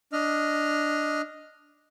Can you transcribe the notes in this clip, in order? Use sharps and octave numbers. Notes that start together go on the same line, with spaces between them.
D4 D#5 F6